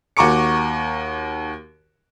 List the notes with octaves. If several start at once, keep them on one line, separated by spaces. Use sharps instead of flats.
D#2 F#4 A#5 C#6 D6 C#7